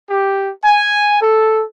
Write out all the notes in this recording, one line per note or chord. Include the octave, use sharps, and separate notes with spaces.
G4
G#5
A4